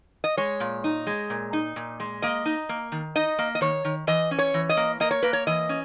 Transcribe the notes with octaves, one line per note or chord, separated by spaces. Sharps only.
D#5
G#3 C#5
A#2
D#4
G#3
A#2
D#4
A#2
G#3
A#3 D#5
D#4
A#3
D#3
D#4 D#5
A#3
D#5
D#3 C#5
D#3
E3 D#5
C#4
C#5
E3
D#5
A#3
A#3 D#5
C#5
A#3 B4
C#5
E3 D#5
C#4